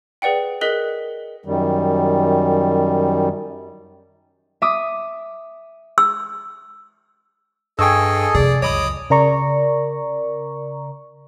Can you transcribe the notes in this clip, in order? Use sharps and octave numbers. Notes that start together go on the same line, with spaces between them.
G#4 B4 D5 F#5 G5
G#4 A#4 D#5 F#6 B6 G7
F#2 D#3 G3
E5 D6 D#6
E6
G2 G#4 A4 D#5 G5 G#5 C#6 E6
F2 C3 G#4 D5
C#2 F#2 C#5 D#5 B5 D6 D#6
C#3 A#4 D5 A#5 C#6